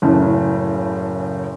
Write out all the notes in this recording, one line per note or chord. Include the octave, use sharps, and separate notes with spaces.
F#1 A2 C#3